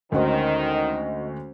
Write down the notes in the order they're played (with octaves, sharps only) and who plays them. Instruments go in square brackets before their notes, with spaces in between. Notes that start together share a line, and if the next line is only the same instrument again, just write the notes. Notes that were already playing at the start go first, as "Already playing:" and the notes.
[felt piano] D2 F#4 [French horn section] D#3 [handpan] G#3 C#4 C5 [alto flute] D#5